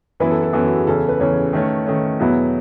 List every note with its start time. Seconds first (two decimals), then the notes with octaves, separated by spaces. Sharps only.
0.20 F#2 E3 B3 E4 B4
0.31 A4
0.43 A4
0.53 F#2 E3 B3 E4 A4
0.65 F#4
0.75 G#4
0.87 E2 C#3 E3 A4
0.98 A4
1.09 B4
1.19 E2 C#3 E3 C#5
1.53 D#3 A3 C#4
1.86 D#3 A3 C#4
2.19 E2 B2 F#3 B3 E4